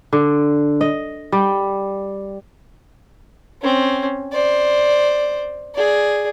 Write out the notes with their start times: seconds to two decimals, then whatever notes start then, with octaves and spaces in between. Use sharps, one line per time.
0.13 D3
0.81 D#5
1.32 G3
3.62 C4 C#4
4.32 C5 D5
5.75 G#4 D5